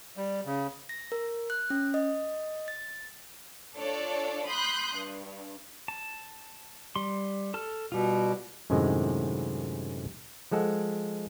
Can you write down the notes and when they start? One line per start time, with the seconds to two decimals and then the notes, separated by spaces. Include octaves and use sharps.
0.17 G3
0.46 C#3
0.89 A#6
1.12 A#4
1.50 F#6
1.70 C#4
1.94 D#5
2.68 A6
3.76 D4 F4 A4 C#5 D5
4.47 B5 C6 D#6 F#6 G6
4.97 G2
5.88 A5
6.96 G3 C6
7.54 A4 A5 F6
7.92 B2 G3 F4
8.70 F#2 A2 C3 D#3 G#3
10.52 F3 G#3 A4 F#5